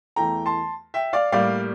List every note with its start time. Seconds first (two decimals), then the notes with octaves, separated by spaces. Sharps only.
0.16 E2 E3 A3 G5 A#5
0.46 A5 C6
0.94 E5 G5
1.13 D5 F5
1.32 A2 G3 A#3 D5 F5